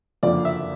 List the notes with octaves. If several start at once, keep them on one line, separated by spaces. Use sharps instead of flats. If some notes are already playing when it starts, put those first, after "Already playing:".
F#1 F2 D3 F3 A#3 D5
E5